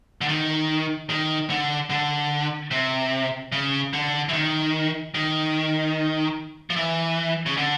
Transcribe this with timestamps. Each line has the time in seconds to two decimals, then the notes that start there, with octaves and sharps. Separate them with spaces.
0.21 D3
0.29 D#3
1.10 D#3
1.50 D3
1.90 D3
2.71 C3
3.52 C#3
3.93 D3
4.29 E3
4.33 D#3
5.14 D#3
6.70 F3
6.76 E3
7.46 C#3
7.57 D3